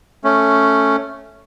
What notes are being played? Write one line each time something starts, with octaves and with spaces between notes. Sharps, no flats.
A3 C#4